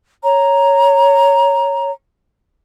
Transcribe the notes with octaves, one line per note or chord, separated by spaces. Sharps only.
C#5 A#5